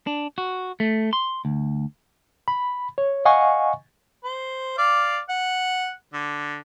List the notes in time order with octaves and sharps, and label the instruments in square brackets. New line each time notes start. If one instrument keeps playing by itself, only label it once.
[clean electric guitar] D4
F#4
A3
C6
D2
[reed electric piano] B5
C#5
D#5 F5 F#5 G#5 C#6
[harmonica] C5
D5 F5
F#5
D3